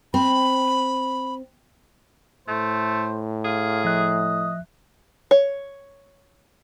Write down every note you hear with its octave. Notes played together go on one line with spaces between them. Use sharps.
C4 B5
A2 A3 C5
G#4 F5
F3 D#5 E5 F#6
C#5